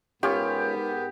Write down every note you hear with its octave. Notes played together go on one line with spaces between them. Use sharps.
G#2 B3 C#4 F4 G4 A#4 C#5